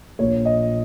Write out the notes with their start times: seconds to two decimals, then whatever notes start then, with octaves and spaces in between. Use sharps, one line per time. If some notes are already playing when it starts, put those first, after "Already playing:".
0.19 A#1 A#2 A#3 C#5
0.45 D#5